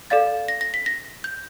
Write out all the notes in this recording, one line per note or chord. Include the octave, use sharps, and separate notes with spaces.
A4 D5 F5 A6
A#6
A#6
B6
A#6
G6